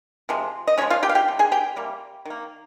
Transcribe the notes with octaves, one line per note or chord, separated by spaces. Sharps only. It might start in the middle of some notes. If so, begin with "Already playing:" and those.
C3 F3 G#3
D#5
C#3 F3 G#3 C#4 C#5
F4 F5
G4 G5
F5
G4 G5
C3 G3
G#4 G#5
G4 G5
C3 G3 A#3
D#3 A#3